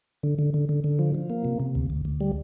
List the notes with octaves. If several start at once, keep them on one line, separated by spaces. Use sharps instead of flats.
D3
D3
D3
D3
D3
F3
F3
A#3
C3
C3
D2
D2
D2
G3